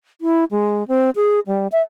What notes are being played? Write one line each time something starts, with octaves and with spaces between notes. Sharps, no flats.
E4
G#3
C4
G#4
G3
E5